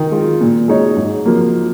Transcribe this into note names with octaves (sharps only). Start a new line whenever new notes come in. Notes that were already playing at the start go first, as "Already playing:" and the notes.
Already playing: D#3
G#3 F4
A#2
G#3 D#4 C#5
G#2
F3 A#3